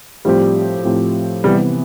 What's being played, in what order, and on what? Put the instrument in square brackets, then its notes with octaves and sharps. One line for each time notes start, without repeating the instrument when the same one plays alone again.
[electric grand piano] A2 F3 C4 G4 [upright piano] G3
[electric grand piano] A2 F3 C4 G4
[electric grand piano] C3 E3 B3 [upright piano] G3